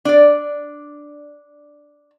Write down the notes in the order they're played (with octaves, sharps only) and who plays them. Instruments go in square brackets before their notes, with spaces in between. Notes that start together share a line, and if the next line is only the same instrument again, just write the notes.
[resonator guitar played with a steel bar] D4 D5